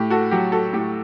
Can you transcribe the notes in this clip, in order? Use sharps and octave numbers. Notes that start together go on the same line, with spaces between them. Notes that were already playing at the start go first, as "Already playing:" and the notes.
Already playing: A2 G4
F#4 A4
F#3 G4
F#4 A4
A2 G4